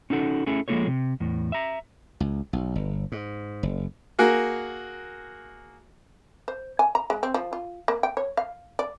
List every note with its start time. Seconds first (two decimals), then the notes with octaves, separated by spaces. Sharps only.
0.10 C#4 D#4 F#4 A4
0.46 A3 C#4 E4 G#4 A4
0.68 F3 G#3 A#3 F#4 A4 C#5
0.87 C3
1.20 E2 A2
1.52 E5 A#5
2.20 C#2
2.53 B1
2.76 G1
3.12 G#2
3.63 F#1
4.19 A#3 F#4 G#4 A#4
6.48 C5
6.79 G#5
6.95 A#5
7.10 G#3
7.23 C4
7.34 F3
7.53 F4
7.88 A#3
8.03 G5
8.17 C#5
8.37 F5
8.79 D5